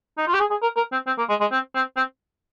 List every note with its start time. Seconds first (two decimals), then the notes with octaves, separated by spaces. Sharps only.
0.17 D#4
0.27 F4
0.34 G4
0.40 G#4
0.50 G#4
0.62 A#4
0.77 A#4
0.92 C4
1.07 C4
1.18 A#3
1.29 G#3
1.40 G#3
1.51 C4
1.75 C4
1.97 C4